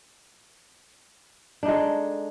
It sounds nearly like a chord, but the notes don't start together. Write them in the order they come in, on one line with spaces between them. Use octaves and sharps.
D4 D#4 G#3 A4